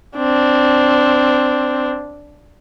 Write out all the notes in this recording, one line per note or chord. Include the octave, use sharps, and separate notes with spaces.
C4 D4